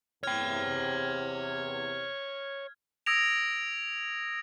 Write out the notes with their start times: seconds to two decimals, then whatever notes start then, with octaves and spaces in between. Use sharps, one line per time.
0.23 E2 C3 C#5 G5 F6 G#6
3.06 D#6 E6 G#6 A#6 D7 F7